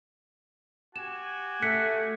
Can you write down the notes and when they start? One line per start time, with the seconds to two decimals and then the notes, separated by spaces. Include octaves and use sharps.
0.96 F#4 G4 G#5 E7
1.62 A3 F#6 B6 C#7